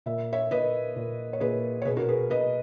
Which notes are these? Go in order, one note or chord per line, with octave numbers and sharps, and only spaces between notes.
A#2 E5
C#5 E5
A#2 B4 D#5
A#2
C#5
A#2 G#4 B4
C#5
B2 G#4 B4
F#4 A#4
G#4 B4
B2 B4 D#5